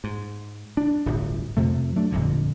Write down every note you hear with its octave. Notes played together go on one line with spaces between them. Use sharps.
G#2
D4
D1 G1
F2 C3 A3
F#3 A3 D4
G1 F2 A#2 D3